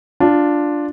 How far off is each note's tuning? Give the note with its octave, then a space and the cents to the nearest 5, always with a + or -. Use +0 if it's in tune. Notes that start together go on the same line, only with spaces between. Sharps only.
D4 +0 F4 +0